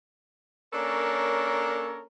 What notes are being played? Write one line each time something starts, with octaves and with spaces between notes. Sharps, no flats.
A#3 C#4 D4 A4 A#4 C#5